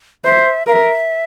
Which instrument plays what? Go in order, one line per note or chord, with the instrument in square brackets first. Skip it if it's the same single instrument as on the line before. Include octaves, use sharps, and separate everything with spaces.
[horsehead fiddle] C5 [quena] E5
[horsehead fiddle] A#4 [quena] F5
[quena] E5